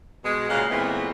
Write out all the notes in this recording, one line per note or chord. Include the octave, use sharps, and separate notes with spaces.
B2 G#3
A#2 C#3 G#3 F5 F#5
A#2 E3 G#3 A3 B3 C4